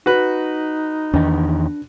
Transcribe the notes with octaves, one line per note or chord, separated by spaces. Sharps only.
D#4 F#4 B4
E2 D#3 D4